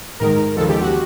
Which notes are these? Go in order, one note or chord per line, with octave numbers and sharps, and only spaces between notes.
G#2 D#3 G#3 A#4
D#2 C#3 F3 G#3 A4
G4
F#4